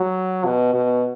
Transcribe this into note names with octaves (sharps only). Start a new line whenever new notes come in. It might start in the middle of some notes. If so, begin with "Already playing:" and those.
Already playing: F#3
B2
B2